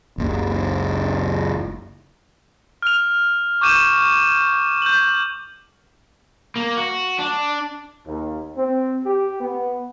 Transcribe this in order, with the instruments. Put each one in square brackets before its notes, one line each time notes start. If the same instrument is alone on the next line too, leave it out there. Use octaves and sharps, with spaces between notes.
[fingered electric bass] F#1 C#2
[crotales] F6 F7
C#6 D6 G6 D#7 E7
G6 F#7
[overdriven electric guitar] A#3
F#4
D4
[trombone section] D#2
C4
G4
B3